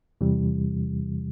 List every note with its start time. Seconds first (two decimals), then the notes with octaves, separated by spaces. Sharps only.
0.21 E2 C3 E3 G3